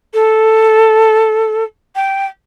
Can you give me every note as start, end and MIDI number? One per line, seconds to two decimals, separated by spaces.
0.14 1.64 69
1.95 2.26 79